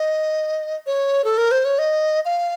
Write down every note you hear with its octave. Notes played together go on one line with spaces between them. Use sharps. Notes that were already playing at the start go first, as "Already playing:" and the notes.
Already playing: D#5
C#5
A4
A#4
C5
C#5
D#5
F5